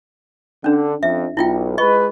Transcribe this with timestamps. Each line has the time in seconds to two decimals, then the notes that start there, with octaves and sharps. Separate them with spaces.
0.64 D3 C#4 D4
1.03 F2 E5
1.37 B1 E4 F4 G5
1.78 G#3 B4 D#5 C#6